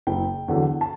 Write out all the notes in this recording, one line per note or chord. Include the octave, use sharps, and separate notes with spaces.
F#1 G5
E2 D3 F#3
A5